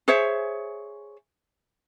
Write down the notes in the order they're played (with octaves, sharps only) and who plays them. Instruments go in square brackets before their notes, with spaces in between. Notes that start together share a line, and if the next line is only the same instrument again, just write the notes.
[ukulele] G#4 C5 C#5 E5